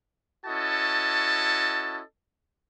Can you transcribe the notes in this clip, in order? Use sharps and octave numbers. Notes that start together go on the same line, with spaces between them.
C#4 E4 F#4 A4 D#5 A5